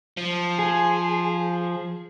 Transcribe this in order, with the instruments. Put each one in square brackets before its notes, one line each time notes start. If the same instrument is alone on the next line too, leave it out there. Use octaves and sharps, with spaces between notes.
[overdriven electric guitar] F3
[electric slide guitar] G#4